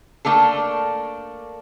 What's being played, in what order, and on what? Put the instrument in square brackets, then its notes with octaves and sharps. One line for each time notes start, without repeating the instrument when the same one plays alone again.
[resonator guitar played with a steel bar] A3 A#3 D4 A4